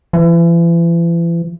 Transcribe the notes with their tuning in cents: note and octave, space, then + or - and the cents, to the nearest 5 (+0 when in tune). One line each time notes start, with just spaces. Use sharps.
E3 +40